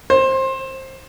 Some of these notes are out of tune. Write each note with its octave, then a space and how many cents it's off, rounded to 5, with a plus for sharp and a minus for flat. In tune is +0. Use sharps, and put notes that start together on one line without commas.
C5 +20